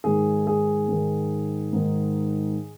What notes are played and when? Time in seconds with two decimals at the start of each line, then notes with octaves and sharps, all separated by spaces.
0.04 G#2 D#3 G#4
0.47 G#4
0.88 G#2 D#3
1.73 G#2 D#3